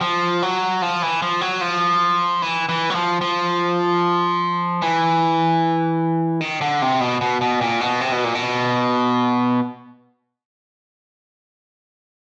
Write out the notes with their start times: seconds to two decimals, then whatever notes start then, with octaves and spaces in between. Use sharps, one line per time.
0.01 F3
0.42 F#3
0.82 F3
1.02 E3
1.22 F3
1.41 F#3
1.61 F3
2.42 E3
2.69 E3
2.90 F#3
2.95 F3
3.21 F3
4.82 E3
6.41 D#3
6.61 D3
6.82 C3
7.01 B2
7.21 B2
7.41 B2
7.61 A#2
7.81 B2
8.01 C3
8.12 B2
8.24 A#2
8.35 B2